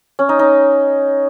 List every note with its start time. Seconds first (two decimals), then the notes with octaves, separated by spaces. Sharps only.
0.19 C#4
0.29 D#4
0.39 D#4